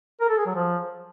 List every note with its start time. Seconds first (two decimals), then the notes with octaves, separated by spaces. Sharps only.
0.21 A#4
0.29 A4
0.38 G#4
0.46 F#3
0.55 F3